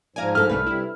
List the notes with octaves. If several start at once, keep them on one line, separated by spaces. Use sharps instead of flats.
G#2 F3 D5 F5 G#5 A#5
G2 A4 F6
C2 A3 B4
C3 G3 E4